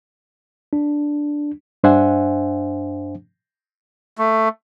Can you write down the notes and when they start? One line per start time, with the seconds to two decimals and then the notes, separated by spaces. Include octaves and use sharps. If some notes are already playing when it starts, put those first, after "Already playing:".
0.73 D4
1.84 G2 D4 C5 E5 F#5 G#5
4.18 A3